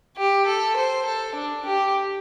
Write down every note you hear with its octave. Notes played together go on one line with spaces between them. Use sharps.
G4
A4
C5
A4
D4
G4